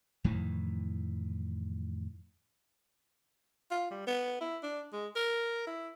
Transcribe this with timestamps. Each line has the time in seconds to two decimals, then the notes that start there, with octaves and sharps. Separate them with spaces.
0.24 F2 A2 D#3 E3
3.71 F4
3.91 G3
4.07 B3
4.41 E4
4.63 D4
4.93 G#3
5.16 A#4
5.67 E4